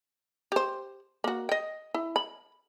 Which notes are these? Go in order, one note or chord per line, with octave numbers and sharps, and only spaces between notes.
G4 C5
A#3 F#4
D#5 G5
E4
B5